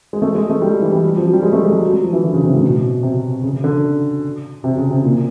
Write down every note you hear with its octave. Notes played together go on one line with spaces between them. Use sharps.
G#3
A3
G#3
A3
G3
E3
G3
F3
F#3
G3
G#3
A3
G#3
F#3
F#3
F#3
F3
E3
D3
C#3
C3
A2
B2
C3
C#3
D3
C3
C#3
C3
A#2